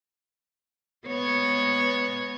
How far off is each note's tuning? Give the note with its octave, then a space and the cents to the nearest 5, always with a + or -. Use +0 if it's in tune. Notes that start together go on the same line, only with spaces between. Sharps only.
G#3 +0 B3 +0 C#5 -5